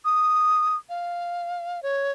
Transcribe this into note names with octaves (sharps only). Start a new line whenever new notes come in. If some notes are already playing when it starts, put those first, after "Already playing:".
D#6
F5
C#5